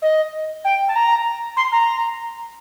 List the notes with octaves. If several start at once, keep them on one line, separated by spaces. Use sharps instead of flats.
D#5
G5
A5
A#5
C6
A#5